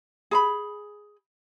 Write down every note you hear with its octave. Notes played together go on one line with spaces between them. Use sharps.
G#4 A#5 B5